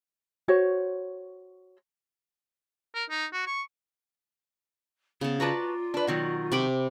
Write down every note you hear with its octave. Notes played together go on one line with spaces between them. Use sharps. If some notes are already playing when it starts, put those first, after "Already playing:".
F#4 C5 C#5
A#4
D#4
F#4
C#6
C#3 B3 A5
F4 F#4 B4 D5 A5 A#5
D4 B4
B2 D#3 F#3
C3 B5 D6